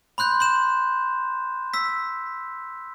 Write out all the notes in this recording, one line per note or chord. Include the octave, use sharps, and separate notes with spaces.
B5 C6 F#6 G6
C6 G6 E7
E6 B6